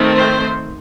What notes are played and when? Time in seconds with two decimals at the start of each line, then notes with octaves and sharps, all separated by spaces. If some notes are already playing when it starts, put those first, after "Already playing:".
Already playing: D#3 A3 C4
0.16 C5